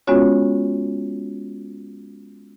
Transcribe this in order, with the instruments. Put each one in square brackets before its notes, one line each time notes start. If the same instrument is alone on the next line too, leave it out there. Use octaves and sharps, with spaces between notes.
[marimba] G#3 B3 C#4 F4 F#4 C#5